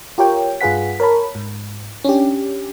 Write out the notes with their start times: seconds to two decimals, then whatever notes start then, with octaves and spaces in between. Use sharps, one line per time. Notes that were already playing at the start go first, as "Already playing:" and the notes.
0.18 F4 G4 A#4 C#5 G5
0.61 G2 F4 G#4 B4 F#5 B6
1.00 A#4 C#5 A5 B5
1.35 G#2
2.04 C#4 D4 G4